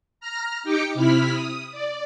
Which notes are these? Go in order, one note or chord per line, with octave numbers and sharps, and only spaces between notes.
A#5 F6 A#6
D#4 G4 G5 D6 C#7
C3 E4 B5 F6 B6
D#6
D5